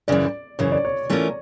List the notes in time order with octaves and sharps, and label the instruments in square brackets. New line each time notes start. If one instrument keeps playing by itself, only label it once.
[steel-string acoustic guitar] F#2 C#3 E3 [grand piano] D5
[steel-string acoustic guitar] F#2 C#3 E3 [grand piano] C#5
[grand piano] D5
C#5
[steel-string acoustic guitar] E3 A3 C#4 F4 A#4